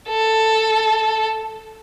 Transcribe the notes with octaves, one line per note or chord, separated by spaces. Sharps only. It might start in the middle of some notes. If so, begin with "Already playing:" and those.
A4